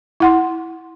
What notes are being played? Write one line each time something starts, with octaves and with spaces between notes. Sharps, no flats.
E4 F#5 C6